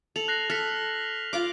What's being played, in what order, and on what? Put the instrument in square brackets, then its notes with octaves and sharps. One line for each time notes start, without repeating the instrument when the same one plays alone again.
[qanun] A4 [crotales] F7 F#7
[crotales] F#6 A#6 C7
[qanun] A4 [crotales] F6 B6
[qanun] F4 F5 D6